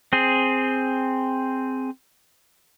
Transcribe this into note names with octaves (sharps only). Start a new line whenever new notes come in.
C4 G#4